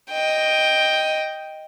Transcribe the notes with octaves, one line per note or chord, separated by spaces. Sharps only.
D#5 G5